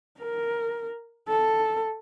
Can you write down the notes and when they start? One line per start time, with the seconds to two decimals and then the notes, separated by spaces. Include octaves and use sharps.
0.19 A#4
1.28 A4